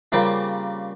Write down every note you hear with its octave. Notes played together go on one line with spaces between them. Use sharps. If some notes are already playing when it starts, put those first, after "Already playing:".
C#3 G3 A#3 C4 F4